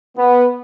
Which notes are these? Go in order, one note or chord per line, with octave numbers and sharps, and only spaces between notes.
B3